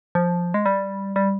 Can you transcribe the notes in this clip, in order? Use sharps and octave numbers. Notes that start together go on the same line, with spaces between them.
F3
G#3
G3
G3